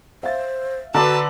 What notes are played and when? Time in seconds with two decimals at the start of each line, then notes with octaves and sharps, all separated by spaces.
0.23 C5 E5 F5 A6
0.94 D3 D4 F#4 B4 A5 A#5 C6 E6